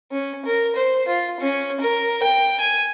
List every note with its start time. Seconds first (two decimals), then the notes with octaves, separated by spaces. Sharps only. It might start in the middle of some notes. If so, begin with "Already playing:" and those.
0.11 C#4
0.45 A#4
0.75 C5
1.08 F4
1.40 C#4
1.80 A#4
2.23 G5
2.60 G#5